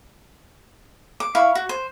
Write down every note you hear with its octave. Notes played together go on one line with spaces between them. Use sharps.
D6
E4 F5 C#6
F#4
C5